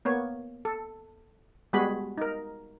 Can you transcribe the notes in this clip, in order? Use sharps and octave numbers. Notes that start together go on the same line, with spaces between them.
A#3 B3 C#5
A4
G3 G#3 B3 F#4 G#4 B5
D#4 A#4